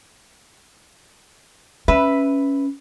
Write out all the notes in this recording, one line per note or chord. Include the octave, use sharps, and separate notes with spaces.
C#4 B4 E5